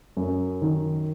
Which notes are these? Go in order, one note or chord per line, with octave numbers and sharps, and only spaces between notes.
F#2
D#3